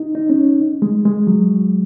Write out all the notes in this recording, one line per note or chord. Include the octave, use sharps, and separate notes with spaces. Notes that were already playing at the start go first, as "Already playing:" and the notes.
Already playing: D#4
D#4
C#4
G#3
G#3
F#3